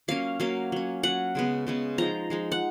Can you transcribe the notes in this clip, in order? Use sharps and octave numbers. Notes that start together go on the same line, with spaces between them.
F#3 A#3 C#4 F5
F#3 A#3 C#4 F5
F#3 C#4
F#3 C#4 F#5
C#3 G#3 B3
C#3 G#3 B3
F3 G#3 D#4 A#5
F3 G#3 D#4
F#5